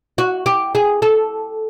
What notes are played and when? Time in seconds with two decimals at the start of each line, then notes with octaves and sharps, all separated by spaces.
0.18 F#4
0.46 G4
0.75 G#4
1.02 A4